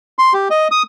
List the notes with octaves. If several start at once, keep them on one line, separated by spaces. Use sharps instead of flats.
C6
G4
D#5
D#6